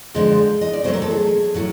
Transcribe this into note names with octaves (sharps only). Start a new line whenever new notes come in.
D3 F3 G#3 C4 D#5
D#5
D5
B2 F#3 A3 C4 C5
A#4
A4
G#4
A2 F#3 A3